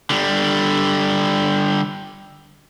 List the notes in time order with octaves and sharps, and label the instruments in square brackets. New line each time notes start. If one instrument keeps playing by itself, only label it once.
[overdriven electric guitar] D3 G3